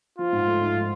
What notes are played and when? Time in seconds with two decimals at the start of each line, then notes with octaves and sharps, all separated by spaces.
0.18 F3 F4
0.33 G#2
0.47 A3
0.61 G#2
0.76 F3